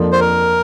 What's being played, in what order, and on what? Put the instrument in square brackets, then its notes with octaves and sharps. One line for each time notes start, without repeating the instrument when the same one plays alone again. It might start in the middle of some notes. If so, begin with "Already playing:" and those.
Already playing: [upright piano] F2 F3 A#3 D4
[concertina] C5
A#4